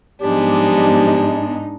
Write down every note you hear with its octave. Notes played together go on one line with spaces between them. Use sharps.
G#2 F3 F#3 G#3 B3 D4 D#4 G4